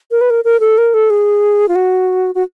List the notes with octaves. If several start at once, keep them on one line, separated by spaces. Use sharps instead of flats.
A#4
B4
A#4
A#4
A4
A#4
A4
G#4
F4
F#4
F#4